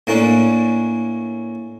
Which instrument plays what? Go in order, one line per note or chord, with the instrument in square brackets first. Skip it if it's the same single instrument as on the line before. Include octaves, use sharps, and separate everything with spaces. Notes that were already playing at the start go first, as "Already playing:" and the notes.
[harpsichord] A2 A#3 C#4 D4